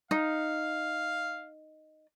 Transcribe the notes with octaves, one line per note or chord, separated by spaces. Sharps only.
D#4 F5